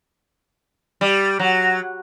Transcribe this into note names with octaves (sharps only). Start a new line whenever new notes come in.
G3
F#3